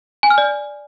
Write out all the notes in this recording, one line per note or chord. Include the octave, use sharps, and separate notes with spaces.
G#5
F6
D5